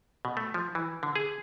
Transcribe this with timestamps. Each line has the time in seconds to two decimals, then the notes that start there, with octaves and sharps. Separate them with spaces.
0.25 B2
0.37 A3
0.54 F3
0.75 E3
1.03 D3
1.16 G#4